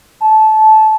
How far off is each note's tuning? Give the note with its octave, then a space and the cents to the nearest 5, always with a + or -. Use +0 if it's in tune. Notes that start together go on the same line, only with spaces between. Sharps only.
A5 -20